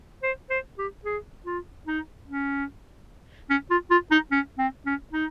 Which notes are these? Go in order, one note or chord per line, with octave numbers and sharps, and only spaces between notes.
C5
C5
G4
G#4
F4
D#4
C#4
C#4
F4
F4
D#4
C#4
C4
C#4
D#4